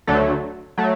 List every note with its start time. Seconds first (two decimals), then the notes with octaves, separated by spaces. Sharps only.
0.07 D2 D3 F#3 A3 A4
0.78 F#3 A3